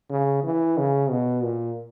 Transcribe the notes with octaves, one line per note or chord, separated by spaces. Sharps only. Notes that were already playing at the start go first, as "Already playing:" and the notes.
C#3
E3
C#3
B2
A#2